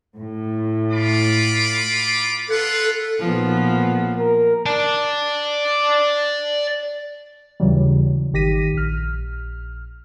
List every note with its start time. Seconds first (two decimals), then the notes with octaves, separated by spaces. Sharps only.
0.16 A2
0.90 F4 B5 D6
2.49 F4 A4 B4 F#5
3.19 B1 A#2 F3 B3
4.18 A#4
4.66 D5 A5
7.60 D#2 C#3 E3 F#3 G3
8.33 G#1 D#3 G4 A#6 B6 D#7
8.74 A#1 F6